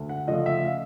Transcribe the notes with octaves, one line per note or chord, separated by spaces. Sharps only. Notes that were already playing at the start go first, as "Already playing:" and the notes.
Already playing: D2
F#5
C#3 F3 A3 D#5
E5
F5